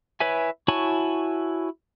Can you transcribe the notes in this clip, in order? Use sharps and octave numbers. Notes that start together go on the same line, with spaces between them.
E4 B4 C#5 E5 G#5
E4 F#4 C#5 G#5 A5